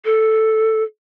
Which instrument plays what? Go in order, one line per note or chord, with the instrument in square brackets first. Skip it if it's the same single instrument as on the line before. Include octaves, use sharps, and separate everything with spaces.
[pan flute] A4